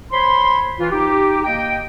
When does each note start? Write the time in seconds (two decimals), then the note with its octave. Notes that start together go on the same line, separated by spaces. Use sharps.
0.12 C5 C#5 B5 C6
0.79 E3 F4
0.91 D#4 G4
1.44 A#3 D#5 G5